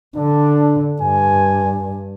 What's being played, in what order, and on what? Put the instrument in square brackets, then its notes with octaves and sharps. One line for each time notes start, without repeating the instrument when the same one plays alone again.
[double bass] D3 [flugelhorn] D4
[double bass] G2 [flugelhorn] G#5